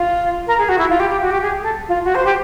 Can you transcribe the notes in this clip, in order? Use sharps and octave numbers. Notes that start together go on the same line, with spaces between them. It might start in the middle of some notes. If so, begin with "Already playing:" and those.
Already playing: F4
A#4
G#4
F#4
E4
F4
G4
G4
F#4
G4
G#4
A4
F4
F#4
C5
G4